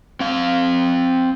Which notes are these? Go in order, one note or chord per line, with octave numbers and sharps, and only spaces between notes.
C4 F5